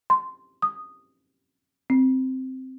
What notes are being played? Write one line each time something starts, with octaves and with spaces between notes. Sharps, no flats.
C6
D#6
C4